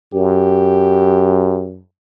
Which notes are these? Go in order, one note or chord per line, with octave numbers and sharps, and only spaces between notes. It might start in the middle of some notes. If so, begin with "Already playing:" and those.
F#2 G4